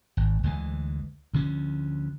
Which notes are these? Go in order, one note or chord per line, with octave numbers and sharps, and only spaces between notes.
G#1
D2 D3 E3 G#3
D2 D3 F3 C#4